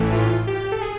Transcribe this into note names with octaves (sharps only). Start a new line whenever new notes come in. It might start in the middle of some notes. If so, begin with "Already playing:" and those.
Already playing: A1 A2 E3 A3
F4
G4
A4
G#4